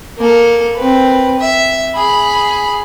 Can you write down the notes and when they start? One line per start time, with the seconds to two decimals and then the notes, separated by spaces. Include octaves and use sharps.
0.18 A#3 A4
0.75 C4 B4
1.40 E5
1.95 G#4 B5